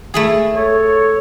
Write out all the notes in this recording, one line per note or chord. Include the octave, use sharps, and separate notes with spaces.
A3 E4 G#4
A4 C#5